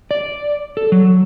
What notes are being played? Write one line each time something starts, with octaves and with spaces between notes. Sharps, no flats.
D5
A4
F#3